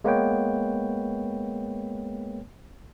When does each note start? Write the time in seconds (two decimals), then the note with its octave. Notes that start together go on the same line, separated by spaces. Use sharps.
0.04 G#3 A#3 B3 B4 C#5 G5